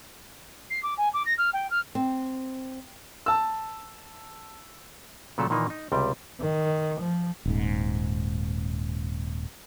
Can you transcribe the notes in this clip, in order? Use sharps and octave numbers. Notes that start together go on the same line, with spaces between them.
C7
D6
G#5
D6
A#6
F6
G5
F6
C4
A5 E6
A#2 C#3 F#3 A3 A4
A#2 D#3 E3 A#3 D#4
D#4
C#2 C3 G3 G5
D#3
F3
D#1 G#2